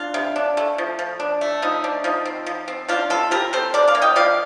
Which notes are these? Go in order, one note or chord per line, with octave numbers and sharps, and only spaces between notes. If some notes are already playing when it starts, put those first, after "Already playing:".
Already playing: D4 F4
C3
D4
A3
F3
F3
D4
A3
F3 D#4
F3 D4
F3 D#4
C4
F3
C4
F3 D4 F4
C4 F4 A4
F3 G4 A#4
C4 A4 C5
D4 A#4 D5
D5 F5
A#3
D#5 G5
F3 D5 F5